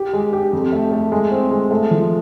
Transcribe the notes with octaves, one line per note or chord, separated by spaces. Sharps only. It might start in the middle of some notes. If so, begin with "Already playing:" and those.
Already playing: G4
G#3
G4
F2
A3
A3
G#3
C4
G#3
A3
F3